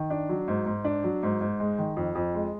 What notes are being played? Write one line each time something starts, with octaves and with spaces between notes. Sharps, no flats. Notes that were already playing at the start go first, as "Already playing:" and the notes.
Already playing: D#3
D4
F#3
G#2
G#2
D4
F#3
G#2
G#2
G#3
D#3
F2
F2
G#3